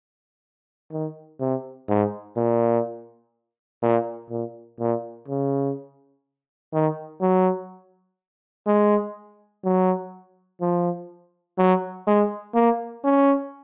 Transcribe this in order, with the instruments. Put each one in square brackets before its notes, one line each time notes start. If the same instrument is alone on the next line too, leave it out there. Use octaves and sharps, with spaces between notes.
[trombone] D#3
C3
G#2
A#2
A#2
A#2
A#2
C#3
D#3
F#3
G#3
F#3
F3
F#3
G#3
A#3
C#4